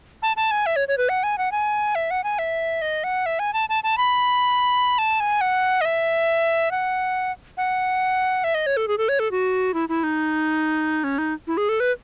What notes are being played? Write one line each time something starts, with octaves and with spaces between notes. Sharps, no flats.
A5
A5
G#5
E5
C#5
C#5
B4
F#5
G#5
F#5
G#5
E5
F#5
G#5
E5
D#5
F#5
E5
G#5
A5
A5
A5
B5
A5
G#5
F#5
D#5
E5
F#5
F#5
E5
D#5
C#5
A4
G#4
A4
C#5
A4
F#4
E4
E4
D#4
C#4
D#4
E4
G#4
A4
B4